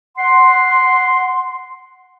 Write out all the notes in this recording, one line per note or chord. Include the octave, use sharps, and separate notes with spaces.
F#5 C6